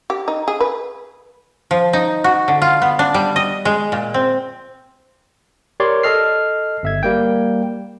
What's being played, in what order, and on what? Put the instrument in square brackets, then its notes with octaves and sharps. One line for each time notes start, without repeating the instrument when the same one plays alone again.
[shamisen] G4
D#4
G#4
B4
[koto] F3
D#4
F#4
D3
F4
B3
D4
G3
D#5
G#3
A#2
C4
[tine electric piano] G4 A#4 C#5 D5 C6
A4 D#5 F6 C7
G1 E5 G#6
G3 A#3 G5